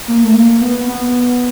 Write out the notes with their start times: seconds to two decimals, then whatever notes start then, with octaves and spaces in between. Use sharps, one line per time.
0.08 A#3
0.24 A3
0.34 A#3
0.61 B3
0.88 B3